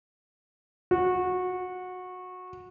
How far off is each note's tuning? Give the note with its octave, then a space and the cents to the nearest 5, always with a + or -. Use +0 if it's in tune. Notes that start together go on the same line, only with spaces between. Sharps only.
F#4 -20